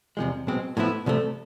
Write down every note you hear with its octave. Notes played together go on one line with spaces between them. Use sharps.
E2 C3 F3 G#3
B1 B2 G#3 C4
A2 F3 B3 E4
C2 C3 F3 A3